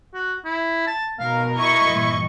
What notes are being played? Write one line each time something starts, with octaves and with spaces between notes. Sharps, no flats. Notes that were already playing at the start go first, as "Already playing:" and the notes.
F#4
E4
A5
B2 D#4 A#4 F5
E4 D#5 C#6
G2 A#2 E3